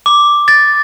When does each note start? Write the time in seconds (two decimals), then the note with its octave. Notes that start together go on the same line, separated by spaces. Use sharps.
0.06 D6
0.48 A6